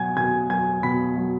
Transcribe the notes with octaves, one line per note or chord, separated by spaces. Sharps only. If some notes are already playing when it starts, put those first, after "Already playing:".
Already playing: B2 F#3 F#5 G#5 G#6
B2 G#5 G#6
F#3 G#5 G#6
B2 B5 B6
F#3